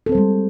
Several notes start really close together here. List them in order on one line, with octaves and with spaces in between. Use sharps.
A4 C4 C5 G3 G#3